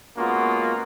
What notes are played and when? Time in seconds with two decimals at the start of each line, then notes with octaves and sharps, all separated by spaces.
0.17 G#3 A#3 B3 C#4 F4 F#4